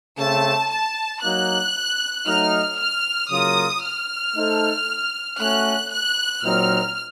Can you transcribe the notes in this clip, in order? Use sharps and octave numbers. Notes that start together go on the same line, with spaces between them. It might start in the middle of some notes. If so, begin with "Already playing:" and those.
C#3 A3 C4 A5
A5
F#3 A#3 D#4 F#6
F#3 A3 D#4 F6
F6
C#3 F#3 A#3 F4 A#4 D#6
F6
A3 D#4 A4 C5
A3 C#4 F#4 F#6
F#6
A#2 F#3 C4 D#4 A#4 F6